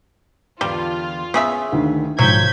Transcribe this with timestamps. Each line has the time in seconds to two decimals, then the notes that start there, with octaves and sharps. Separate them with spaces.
0.61 E2 D3 G3 F4 A5
1.34 C#3 B3 G#4 E5
1.72 D2 D#3 F5
2.19 B1 G#2 D#3 F3 F#3 G6 G#6 B6